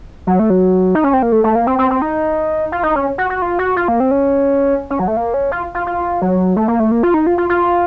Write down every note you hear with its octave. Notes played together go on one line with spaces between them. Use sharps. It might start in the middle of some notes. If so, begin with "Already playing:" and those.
F#3
A3
F#3
D#4
C#4
C4
A#3
A3
A3
A#3
C4
C4
C4
D#4
F4
D#4
C#4
F#4
F#4
F4
F#4
F4
A#3
C4
C#4
C#4
F#3
A3
A#3
C#4
F4
F4
F4
F#3
A3
A#3
A3
A#3
F4
D#4
F4
F4
F4